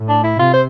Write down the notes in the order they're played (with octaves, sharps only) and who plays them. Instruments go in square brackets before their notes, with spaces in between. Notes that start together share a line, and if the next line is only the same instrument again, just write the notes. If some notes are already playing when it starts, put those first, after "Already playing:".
Already playing: [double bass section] A2
[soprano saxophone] D4
E4
[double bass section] C3 [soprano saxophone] F4
[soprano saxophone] C5